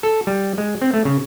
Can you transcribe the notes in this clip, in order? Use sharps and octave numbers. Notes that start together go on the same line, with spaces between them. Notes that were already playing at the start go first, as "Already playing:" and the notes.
A4
G3
G#3
C4
A3
C#3